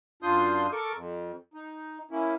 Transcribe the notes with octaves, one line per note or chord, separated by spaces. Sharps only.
F#2 D4 F4 C6 D#6 G6
A4 A#4 C#6 D6
F2
D#4
A#3 C#4 E4